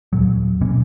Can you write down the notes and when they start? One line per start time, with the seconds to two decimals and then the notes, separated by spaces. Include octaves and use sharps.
0.13 D#2 A#2 F#3
0.61 G1 B2 A#3 C#4